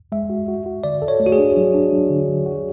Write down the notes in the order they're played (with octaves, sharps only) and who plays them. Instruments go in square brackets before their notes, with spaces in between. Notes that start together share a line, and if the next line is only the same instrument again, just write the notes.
[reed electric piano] G#3 [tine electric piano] E5
[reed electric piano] F#4
F#4
F#4
[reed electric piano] D3 [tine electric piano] D5
[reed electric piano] A4
[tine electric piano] C#5
[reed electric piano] A3
[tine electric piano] F#4
G#4
[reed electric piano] D4
F#3
D4
F#3
D3
F#3
F#4